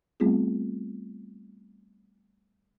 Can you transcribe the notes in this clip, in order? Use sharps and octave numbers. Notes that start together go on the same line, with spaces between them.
G3 A3 B3 C4 F4 G#4